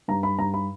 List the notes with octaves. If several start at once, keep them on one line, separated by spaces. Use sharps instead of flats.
G2 A#5
B5
G2 A#5
B5